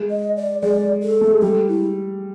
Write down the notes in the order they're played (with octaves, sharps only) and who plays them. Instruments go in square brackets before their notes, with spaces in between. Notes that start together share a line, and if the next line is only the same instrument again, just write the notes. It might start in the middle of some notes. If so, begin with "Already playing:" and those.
Already playing: [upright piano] G#3
[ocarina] D#5
D5
[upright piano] G#3 [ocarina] D5
[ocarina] A4
[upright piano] A3
G#3
[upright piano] G3 [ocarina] A4
[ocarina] E4